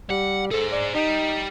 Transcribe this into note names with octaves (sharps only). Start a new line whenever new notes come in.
G3 F#5
G#4 A4 C5
D5
G3 D#4